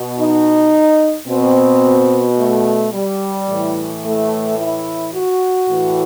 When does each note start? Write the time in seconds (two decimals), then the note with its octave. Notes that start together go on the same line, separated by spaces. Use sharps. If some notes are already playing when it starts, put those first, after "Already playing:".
Already playing: B2
0.18 D#4
1.27 B2 C4
2.38 A3
2.92 G3
3.48 A2 E3
4.03 A3
4.58 E4
5.14 F#4
5.68 A2 E3